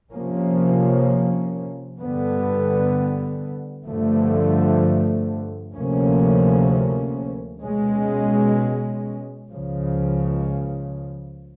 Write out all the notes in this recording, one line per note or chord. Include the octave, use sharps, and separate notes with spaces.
C3 F3 A#3 C#4
G2 D3 G3 B3
G2 D3 F3 A3
D2 C3 F3 A#3 C#4
B2 G#3 C#4
C#2 C#3 F3